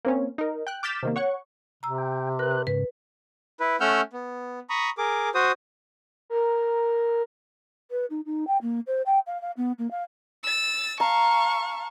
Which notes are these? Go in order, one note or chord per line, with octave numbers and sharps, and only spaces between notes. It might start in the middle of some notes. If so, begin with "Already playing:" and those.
A#3 C4 C#4
D#4 A#4
G5 F#6
D6 F6 G6 A6 B6 E7
C3 D#3 A#3
C#5 F#5 C#6
C3 A#5 E6
G5
A#4 B4 F#6
G#2 C#3 B4
E4 B4
A3 C#4 F#5 E6 F6 G6
B3
A#5 B5 C#6 D#6
G#4 A#4 D6
F#4 C5 D#6
A#4
B4
D#4
D#4
G5
A#3
C5
G5
F5
F5
B3
A#3
F5
E6 A6
F5 A5 A#5 C#6